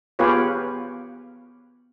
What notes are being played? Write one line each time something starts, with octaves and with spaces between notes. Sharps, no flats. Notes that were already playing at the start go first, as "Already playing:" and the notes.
B3 F4 G4 G#4 B4 C#5